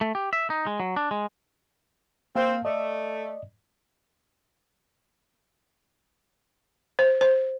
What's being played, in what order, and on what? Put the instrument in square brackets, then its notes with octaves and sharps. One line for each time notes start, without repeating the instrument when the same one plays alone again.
[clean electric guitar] A3
G4
E5
D#4
G#3
F#3
D4
G#3
[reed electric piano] A#3 F5 [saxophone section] C4
[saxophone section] A3 [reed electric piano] D5 D#5
[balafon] C5
C5